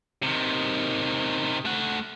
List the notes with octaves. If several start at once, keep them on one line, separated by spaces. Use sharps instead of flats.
C3 D#3
A3 F#5